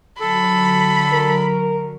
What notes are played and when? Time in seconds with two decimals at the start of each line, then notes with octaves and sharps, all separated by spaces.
0.20 D3 F#3 A4 B5
1.13 A#4